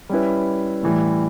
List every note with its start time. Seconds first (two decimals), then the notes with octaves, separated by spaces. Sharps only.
0.10 G3 C#4 E4 B4
0.83 A2 E3 G3